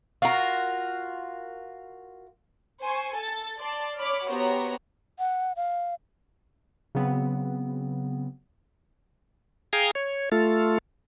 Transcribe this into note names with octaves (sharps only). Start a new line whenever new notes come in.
F4 F#4 A#4
C5 G#5 C#6
A4 A6
D5 A5 C6
C#5 B5 D6 F6
B3 F#4 G4 C5 C#5 A#5
F#5
F5
C#3 F#3 B3 C4
G#4 F5 G5 G#5 A#5
C#5
A3 F4 A4